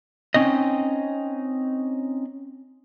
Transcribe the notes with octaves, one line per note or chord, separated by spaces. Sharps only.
C4 C#4 D#4 D#5